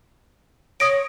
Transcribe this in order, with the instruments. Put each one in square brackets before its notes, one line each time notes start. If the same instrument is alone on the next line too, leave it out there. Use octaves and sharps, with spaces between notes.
[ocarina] C#5 [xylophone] D#6 A#6 D7